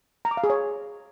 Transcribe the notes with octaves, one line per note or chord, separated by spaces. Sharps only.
A#5
D6
F5
G#4
C#5